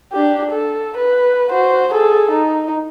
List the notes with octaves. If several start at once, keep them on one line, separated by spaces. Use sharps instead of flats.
D4 G4
A4
B4
F#4 C5
G#4 A4
D#4